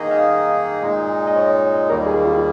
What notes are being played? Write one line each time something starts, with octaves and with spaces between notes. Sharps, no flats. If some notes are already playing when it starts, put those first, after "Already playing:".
Already playing: D#3 A#3 D#4 G#4 D#5
F5
A#2 G#3 D#4
D#5
C#5
D#2 D#3 G3 A#3 A#4
G#4
F4